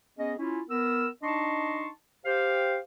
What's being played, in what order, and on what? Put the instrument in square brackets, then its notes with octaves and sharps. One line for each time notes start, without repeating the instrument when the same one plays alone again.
[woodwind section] B3 C#4 G#4 D#5
C#4 E4 F4
B3 A#4 E6
D4 D#4 D#5 A5 C6 C#6
G4 C5 F5